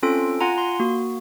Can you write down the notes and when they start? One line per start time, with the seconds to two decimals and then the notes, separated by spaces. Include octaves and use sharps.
0.03 C4 C#4 F4 A4 D7
0.41 F4 F#5 G#5 A#5
0.58 C6
0.80 A#3 F#4